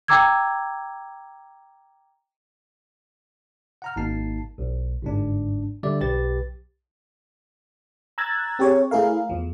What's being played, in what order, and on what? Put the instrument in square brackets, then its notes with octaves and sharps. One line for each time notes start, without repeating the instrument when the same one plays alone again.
[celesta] G5 A#5 D6 E6 G#6
[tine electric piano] F#5 A#5 F6
G#1 A#3 D#4 A5 C7
B1
G1 G#2 D4
D3 G3 D5 E5
B1 G4 B4 A6
[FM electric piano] A#5 E6 F#6 G#6 A6
C4 G4 G#4 C#5
A3 E4 G#4 A#4 F5
E2 F3